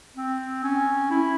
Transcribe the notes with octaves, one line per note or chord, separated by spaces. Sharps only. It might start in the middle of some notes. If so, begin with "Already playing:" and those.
C4
C#4
E4